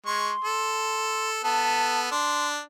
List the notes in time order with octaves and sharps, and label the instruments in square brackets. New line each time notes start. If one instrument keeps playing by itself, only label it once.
[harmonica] G#3 C#6 [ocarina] C6
[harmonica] A4
[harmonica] B3 A4 [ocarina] A5
[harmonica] D4 [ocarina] C6